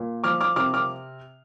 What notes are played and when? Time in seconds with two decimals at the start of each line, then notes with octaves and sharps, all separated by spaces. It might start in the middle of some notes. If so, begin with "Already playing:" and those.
Already playing: A#2
0.24 F3 D6 F6
0.41 D6 F6
0.56 C3 D6 F6
0.74 D6 F6